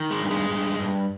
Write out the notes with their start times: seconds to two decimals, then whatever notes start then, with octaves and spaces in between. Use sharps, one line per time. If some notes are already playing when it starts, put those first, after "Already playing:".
Already playing: D#3
0.10 G#3
0.20 G2
0.30 G#3
0.50 G2
0.79 G2